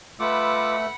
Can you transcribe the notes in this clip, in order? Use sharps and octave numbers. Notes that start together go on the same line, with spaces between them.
A3 F4 B4 D#5 F#5 B5 D6 E6